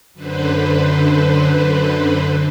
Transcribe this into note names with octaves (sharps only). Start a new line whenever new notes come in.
F#2 D3 B4 C5